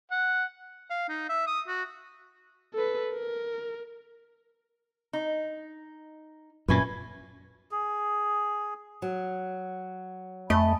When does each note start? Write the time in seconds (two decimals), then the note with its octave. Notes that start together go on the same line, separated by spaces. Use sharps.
0.12 F#5
0.90 F5
1.09 D#4
1.29 E5
1.47 D#6
1.68 F#4
2.74 A4 B4
3.12 A#4
5.13 D#4
6.68 F#2 A#2 C#4 E4 B4
7.71 G#4
9.02 F#3
10.50 F2 A3 D#5 G#5 A5 B5